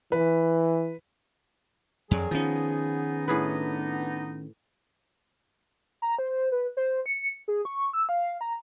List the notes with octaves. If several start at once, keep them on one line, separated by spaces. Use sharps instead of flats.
E3 B4
F2 D3 D#3 F#3 G#4
D#3 F3 B3 C#4 D#4
A2 D4 G#4 B4
A#5
C5
B4
C5
C#7
G#4
C#6
E6
F5
A#5